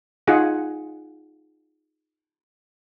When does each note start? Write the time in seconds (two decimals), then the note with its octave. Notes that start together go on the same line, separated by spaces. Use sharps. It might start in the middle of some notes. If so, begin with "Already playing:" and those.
0.27 D#4 F4 G#4 F#5 G#5